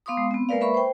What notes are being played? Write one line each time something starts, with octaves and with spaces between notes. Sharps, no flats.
B3 F5 C6 D6 D#6
G#3
B3 C4
G#3 A#3 A#4 B4 D5 F5
B4 E5 B5 C#6
C5 G5